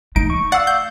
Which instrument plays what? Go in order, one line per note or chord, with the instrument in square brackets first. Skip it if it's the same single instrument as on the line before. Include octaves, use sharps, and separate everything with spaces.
[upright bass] A3 [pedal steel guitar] D#4 [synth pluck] D7
[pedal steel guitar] C#6
[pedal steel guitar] D5 F5 E6 [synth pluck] F#5
[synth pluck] G6